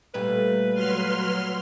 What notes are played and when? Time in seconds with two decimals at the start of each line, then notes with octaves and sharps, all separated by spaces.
0.14 A#2 G3 A3 B4
0.74 F#3 C6 F6